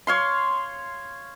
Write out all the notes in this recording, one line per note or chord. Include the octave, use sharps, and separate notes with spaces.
C#5 F5 C6